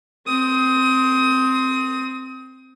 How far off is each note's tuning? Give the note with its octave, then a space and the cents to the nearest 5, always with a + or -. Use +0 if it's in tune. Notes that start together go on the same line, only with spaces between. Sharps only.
C4 +0 D#6 +25